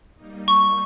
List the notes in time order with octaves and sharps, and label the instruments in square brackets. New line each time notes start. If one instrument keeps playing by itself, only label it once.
[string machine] G3 A#3 D#4
[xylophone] C#6